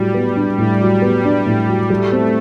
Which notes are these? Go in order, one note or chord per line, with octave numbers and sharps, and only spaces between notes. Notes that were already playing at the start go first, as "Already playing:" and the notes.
Already playing: A2 F#3 G3
B3
D4
A2 G3
F#3
B3
D4
A2
F#3
G3 A3
C4